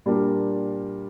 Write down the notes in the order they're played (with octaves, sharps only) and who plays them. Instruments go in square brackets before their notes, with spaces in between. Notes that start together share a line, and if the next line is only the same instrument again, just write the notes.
[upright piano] A#2 G3 D4 G4 A#4